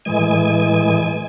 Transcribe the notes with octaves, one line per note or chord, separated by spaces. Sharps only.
A2 E3 G#3 G#5